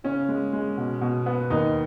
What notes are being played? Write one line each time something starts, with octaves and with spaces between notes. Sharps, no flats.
C#3 C#4
G#3
G#3
B2
B2
B3
D#2 D#4